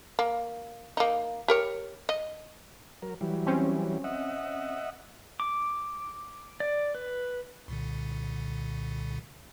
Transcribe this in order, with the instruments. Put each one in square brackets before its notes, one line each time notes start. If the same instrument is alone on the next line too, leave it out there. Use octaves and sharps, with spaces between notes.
[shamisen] A#3
A#3 D#4
G4 A#4 C#5
D#5
[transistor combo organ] F#3 A#4
E3 F#3 G3
[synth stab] C4 C#4
[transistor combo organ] D#5 E5 F#5
[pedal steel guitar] D6
D5
B4
[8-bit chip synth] C2 A#2 D3